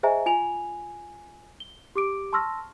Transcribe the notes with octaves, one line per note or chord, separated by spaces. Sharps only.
G#4 C5 D#5 E5 G#5 A#5
F4 G#5 F7
G7
G4 D6 D7
A5 C6 C#6 E6 F6 A#6